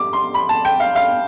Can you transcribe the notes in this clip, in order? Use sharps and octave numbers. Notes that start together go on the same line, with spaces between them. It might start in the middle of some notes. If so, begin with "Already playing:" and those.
Already playing: G3 D6
C6
B5
A5
G5
F5
F5